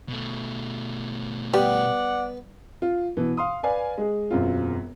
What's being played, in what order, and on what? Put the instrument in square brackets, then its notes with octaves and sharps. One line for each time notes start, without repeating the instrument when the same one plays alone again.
[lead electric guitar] B2 A3
[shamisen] G3 [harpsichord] B3 [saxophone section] D5 F#5
[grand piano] F4
B2 E3
F5 C6 D#6
B4 D5 F5 G#5
G#3 G#4
E1 F#2 C4 F4